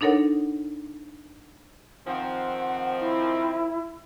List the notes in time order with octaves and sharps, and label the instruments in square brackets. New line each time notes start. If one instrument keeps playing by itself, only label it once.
[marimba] D4 D#4 A4 A#4 C#5 F#5
[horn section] D#3 F3 C4 [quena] F#5
[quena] E4